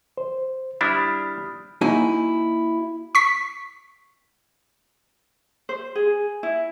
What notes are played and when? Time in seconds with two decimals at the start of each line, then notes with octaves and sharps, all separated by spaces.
0.18 C5
0.81 G3 D4 E4 B5 D#6 F6
1.81 A#3 D#4 E4 F#4 G#5
3.15 C#6 B6
5.69 C5
5.95 G#4
6.43 E4